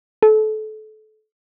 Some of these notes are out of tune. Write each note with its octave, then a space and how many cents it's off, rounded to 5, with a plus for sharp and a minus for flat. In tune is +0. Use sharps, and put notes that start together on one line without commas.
A4 -30